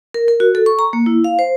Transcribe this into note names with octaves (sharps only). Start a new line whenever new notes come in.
A#4
A#4
F#4
A4
C#6
A#5
A#3
E4
F5
C5